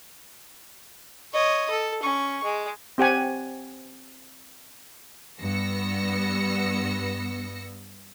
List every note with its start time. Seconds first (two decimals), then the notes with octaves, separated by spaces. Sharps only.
1.33 C#5 D#5
1.70 A4
2.02 C#4 C#6
2.44 G#3
2.98 C4 G4 F#5 G#5
5.40 G2 B3 E6 A#6 C#7